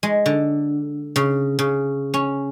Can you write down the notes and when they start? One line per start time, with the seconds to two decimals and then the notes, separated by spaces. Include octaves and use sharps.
0.03 G#3
0.26 D3
1.16 C#3
1.59 C#3
2.14 C#4